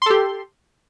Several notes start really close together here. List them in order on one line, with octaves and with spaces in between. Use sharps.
C6 A4 G4